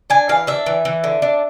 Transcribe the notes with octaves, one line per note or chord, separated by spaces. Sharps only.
D4 G#5
E3 F5
D4 E5
E3
E3
D3
D4